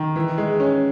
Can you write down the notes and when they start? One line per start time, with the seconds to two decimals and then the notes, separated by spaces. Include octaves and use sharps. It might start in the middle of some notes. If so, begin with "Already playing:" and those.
Already playing: D#3
0.16 E3
0.38 G#3
0.60 C#4